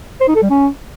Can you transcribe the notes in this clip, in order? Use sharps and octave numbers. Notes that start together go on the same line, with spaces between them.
C5
D#4
A4
G3
C#4